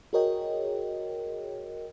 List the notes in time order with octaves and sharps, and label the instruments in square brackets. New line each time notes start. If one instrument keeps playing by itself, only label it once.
[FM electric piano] F#4 G#4 A#4 C#5 D#5 G5